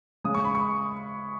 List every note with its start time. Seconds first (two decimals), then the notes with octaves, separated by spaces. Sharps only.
0.24 C#3 G#3 C#4 D#6
0.34 C#6
0.45 B5
0.55 C#6